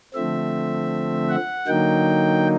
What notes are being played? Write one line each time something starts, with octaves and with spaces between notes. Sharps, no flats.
D3 F3 A3 C4 E5
F#5
D3 F#3 A#3 D#4 G5